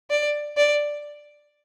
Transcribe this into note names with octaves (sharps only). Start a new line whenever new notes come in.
D5
D5